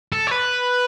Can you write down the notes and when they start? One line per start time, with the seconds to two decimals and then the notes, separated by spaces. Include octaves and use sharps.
0.12 A4
0.27 C#5
0.31 B4